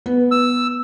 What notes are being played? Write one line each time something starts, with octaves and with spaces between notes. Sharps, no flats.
B3
E6